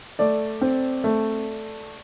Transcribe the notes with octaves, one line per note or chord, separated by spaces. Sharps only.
A3 D5
C4
A3